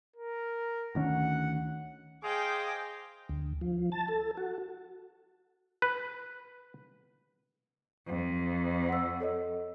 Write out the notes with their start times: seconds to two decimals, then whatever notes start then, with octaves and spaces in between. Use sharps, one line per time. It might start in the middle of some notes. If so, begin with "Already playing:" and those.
0.16 A#4
0.95 D2 D#3 C#4 F#5
2.23 G#4 C5 D#5 F5 G5 D6
3.29 D2
3.61 F3
3.92 A5
4.08 A4
4.37 F#4
5.82 B4
8.08 F2
8.89 F#5 E6
9.20 A4 C#5 D#5